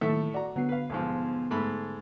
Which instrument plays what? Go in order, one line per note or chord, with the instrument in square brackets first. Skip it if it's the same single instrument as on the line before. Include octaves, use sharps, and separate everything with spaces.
[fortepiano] A2 A4 E5 [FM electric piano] D#3 F#3 A#3
[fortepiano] F#4 A#5 [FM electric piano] D5
[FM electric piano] D3 B3 C7 [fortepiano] F#3
[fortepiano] B4 F5
B1 G#2 F3
G#2 A3 B5